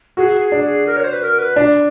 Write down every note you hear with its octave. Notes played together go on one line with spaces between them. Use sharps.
F#4 G#4
G#4
D4
G#4
A#4
C#5
C5
B4
A#4
B4
D4